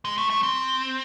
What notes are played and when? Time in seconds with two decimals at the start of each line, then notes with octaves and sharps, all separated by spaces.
0.05 G#3
0.18 A3
0.30 A3
0.43 C4